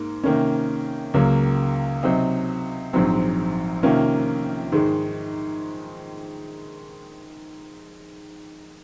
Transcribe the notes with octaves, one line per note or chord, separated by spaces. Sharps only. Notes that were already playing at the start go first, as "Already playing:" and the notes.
Already playing: G#2 A#3
C3 D#3 A#3 C#4
C#2 C#3 F#3 A#3
C3 F#3 C4 D#4
A#1 G#2 F#3 C4
C3 D#3 A#3 C#4 F4
G#2 D#3 G#3